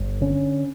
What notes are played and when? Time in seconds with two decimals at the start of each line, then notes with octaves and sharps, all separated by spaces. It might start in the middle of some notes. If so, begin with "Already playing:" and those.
Already playing: G1
0.21 D3 C#4